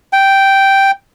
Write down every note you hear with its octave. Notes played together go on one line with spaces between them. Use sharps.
G5